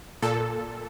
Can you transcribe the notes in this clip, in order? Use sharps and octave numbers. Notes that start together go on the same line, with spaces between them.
A#2 A4